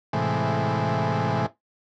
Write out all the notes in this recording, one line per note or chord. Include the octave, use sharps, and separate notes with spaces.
A2 C3 E3 G#3